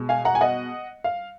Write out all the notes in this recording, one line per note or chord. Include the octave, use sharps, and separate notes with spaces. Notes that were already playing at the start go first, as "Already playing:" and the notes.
Already playing: B2 G#3
F5 G#5
F#5 A#5
G#5
D#5 F#5
F5